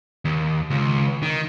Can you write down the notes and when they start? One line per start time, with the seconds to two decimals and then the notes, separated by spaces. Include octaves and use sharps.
0.25 D#2
0.70 C#2
1.23 D#3